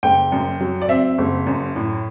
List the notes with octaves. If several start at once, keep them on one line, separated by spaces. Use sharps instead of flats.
F#1 G5
F#2
F#3
D5
C4 E5
F#1
F#2
A2